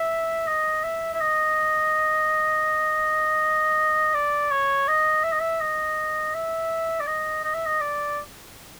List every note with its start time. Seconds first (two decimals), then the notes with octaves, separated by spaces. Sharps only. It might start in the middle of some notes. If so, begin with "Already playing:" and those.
Already playing: E5
0.47 D#5
0.84 E5
1.14 E5
1.21 D#5
4.14 D5
4.51 C#5
4.88 D#5
5.24 E5
5.32 D#5
5.40 E5
5.61 D#5
6.34 E5
7.00 D5
7.07 D#5
7.44 D#5
7.55 E5
7.66 D#5
7.81 D5